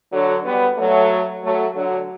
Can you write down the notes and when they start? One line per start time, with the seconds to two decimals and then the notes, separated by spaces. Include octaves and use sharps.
0.13 D3 F#3
0.45 G3 B3
0.78 F#3 A3
1.43 F#3 A3
1.75 D3 F#3